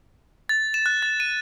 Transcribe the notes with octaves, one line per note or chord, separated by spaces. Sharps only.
A6
E7
F#6
A6
D#7